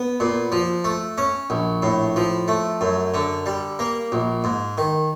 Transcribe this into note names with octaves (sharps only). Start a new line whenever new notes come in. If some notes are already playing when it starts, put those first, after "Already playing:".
Already playing: B3
A#2
F3
A3
C#4
A#1
A2
F3
A3
F#2
D3
G3
A#3
A#1
G#2
D#3